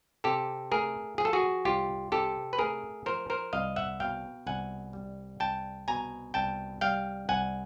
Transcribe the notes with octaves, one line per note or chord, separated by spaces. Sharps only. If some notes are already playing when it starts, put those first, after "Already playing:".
C3 G4 A4
A3 G#4 A#4
F3 G#4
A4
F#4 G#4
C2 F4 G4
C3 G4 A4
B4
A3 G#4 A#4
F3 A#4 C5
A#4 C5
C2 D#5 F5
E5 F#5
B2 F5 G5
C2 F#5 G#5
G3
C2 G5 A5
B2 G#5 A#5
C2 G5 A5
G3 F5 G5
C2 F#5 G#5